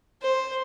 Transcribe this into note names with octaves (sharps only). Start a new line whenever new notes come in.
C5